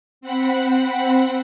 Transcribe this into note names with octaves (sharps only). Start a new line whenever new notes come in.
C4 F#5 B5